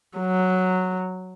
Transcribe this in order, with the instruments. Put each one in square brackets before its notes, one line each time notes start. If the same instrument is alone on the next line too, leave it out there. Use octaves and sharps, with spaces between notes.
[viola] F#3